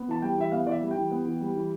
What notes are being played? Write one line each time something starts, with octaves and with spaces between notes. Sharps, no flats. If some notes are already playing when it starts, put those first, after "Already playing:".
Already playing: B3
E3 A5
G3 G5
E3 E5
B3 F5
E3 D5
E5
G3
G5
E3
B3
E3
G3
E3